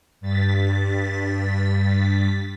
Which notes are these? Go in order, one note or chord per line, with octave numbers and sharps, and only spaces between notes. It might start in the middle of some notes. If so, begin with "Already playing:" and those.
G2 A6 B6